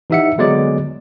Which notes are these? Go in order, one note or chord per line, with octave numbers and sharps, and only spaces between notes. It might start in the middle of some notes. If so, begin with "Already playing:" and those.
E3 D#4 G4 E5 F#5 C#7
D3 F#3 G#3 B3 D5